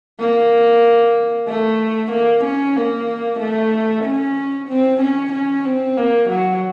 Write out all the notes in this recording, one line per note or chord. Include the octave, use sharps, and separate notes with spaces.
A#3
A3
A#3
C#4
A#3
A3
C#4
C4
C#4
C#4
C4
A#3
F#3